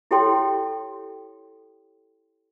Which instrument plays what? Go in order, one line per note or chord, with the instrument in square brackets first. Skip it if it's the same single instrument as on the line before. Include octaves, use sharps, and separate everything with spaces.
[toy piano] E4 G4 A4 C#5 G5 C6